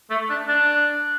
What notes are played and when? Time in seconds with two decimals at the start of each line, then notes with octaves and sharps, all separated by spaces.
0.10 A3
0.29 D4
0.48 D4